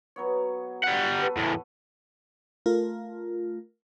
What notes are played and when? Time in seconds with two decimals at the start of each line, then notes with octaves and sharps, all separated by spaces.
0.16 F#3 B3 C#5
0.84 G3 F#5
1.18 A4 B4
1.37 E2 A2
2.66 A3 F4 A#4